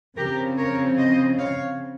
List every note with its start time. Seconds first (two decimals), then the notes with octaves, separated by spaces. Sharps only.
0.17 C#3 F3 C4 G4 A#4
0.58 A#4 C#5
0.98 C5 D#5
1.39 C#5 F5